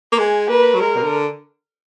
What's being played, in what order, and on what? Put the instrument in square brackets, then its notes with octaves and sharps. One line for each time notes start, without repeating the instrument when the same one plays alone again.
[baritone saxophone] A#3
[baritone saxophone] G#3 [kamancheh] G#5
[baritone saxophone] A#3 [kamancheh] B4
[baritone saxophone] F#3
[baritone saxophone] G#3 [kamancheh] A#4
[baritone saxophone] B2
D3